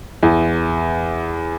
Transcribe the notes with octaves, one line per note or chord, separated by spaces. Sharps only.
E2